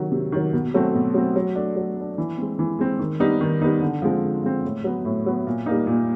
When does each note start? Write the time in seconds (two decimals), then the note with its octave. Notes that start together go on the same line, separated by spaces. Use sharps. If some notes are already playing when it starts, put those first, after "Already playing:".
Already playing: C3 D#3 F#3
0.12 C3
0.32 D#3 F#3
0.53 B2
0.74 F#3 A3 C4
0.95 B2
1.14 F#3 A3 C4
1.36 F#3
1.55 A3 D4
1.76 F#3
1.97 A3 D4
2.18 E3
2.38 G#3 C4
2.59 E3
2.79 G#3 C4
2.99 D#3
3.20 G3 B3 D#4
3.41 D#3
3.61 G3 B3 D#4
3.82 D3
4.02 F3 G#3 C4
4.22 D3
4.44 F3 G#3 C4
4.65 A2
4.84 F#3 B3
5.05 A2
5.26 F#3 B3
5.47 A#2
5.66 G3 A#3 D#4
5.87 A#2